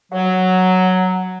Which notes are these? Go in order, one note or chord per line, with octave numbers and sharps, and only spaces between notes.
F#3